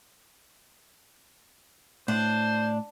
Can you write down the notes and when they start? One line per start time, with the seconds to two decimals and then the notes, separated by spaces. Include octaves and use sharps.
2.08 A2 D4 C5